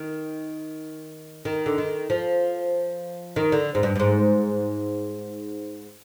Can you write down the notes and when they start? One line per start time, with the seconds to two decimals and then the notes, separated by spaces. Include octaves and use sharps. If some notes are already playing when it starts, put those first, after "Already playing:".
Already playing: D#3
1.45 D#3
1.66 D3
1.78 D#3
2.10 F3
3.36 D#3
3.52 D3
3.75 G#2
3.83 G2
3.96 G2
4.00 G#2